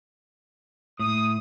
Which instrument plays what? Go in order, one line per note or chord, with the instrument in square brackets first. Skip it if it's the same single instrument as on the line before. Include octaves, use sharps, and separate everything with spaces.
[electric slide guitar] A2 [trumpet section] D#6